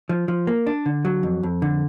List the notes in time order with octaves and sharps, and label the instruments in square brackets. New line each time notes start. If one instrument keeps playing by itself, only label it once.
[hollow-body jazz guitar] F3
F3
A#3
D4
D3
F#3
F2
F2
D3